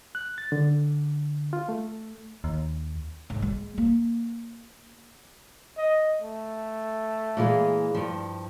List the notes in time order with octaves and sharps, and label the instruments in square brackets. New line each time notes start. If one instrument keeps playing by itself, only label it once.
[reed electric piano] F#6
A6
D3
F4
A3
[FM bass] D#2
[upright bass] G#2
G#3
A#3
[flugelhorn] D#5
A3
[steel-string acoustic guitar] A#2 E3 G#3
G2 F3